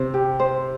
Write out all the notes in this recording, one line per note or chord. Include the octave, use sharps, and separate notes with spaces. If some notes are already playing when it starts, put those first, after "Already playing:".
Already playing: C3 C5
G4
C5